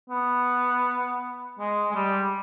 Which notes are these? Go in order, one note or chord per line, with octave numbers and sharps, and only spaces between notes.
B3
G#3
G#3
G3